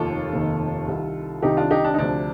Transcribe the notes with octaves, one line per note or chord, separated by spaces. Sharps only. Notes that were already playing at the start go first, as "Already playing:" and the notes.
Already playing: F1 D#2 D#3 F4 A4
F1 D#2 D#3
C2 C3 D#3
C2 C3 D#3 D#4 G4
D4 F4
D#4 G4
D4
D#4
D2 C3 F3 D4